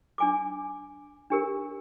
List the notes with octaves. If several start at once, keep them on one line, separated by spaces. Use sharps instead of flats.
D4 G#5 D6
D4 G4 A#4